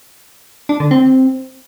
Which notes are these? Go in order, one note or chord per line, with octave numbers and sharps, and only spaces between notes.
D4
D3
C4